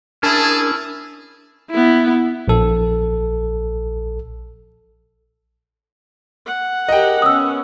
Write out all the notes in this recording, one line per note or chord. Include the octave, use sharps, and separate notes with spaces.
C#4 D4 E4 G#4 A#4 A5 D#6
B3 E4
A#1 A4
F#5
G4 G#4 A#4 D#5 G5
B3 C#4 D#6 E6